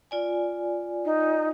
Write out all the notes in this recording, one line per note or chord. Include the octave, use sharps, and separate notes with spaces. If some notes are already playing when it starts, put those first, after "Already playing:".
F4 D5 G#5
D#4